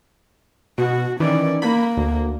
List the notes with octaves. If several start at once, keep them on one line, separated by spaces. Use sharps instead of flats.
B2 F#4
D#3 E3 C#4 D5
A#3 B5
D2